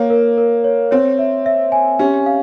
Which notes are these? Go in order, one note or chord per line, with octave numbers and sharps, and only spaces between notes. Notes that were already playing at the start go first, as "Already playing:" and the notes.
Already playing: A#3 C#5
A#4
A#4
C#5
C4 C#5
E5
E5
G#5
C#4 G4
F5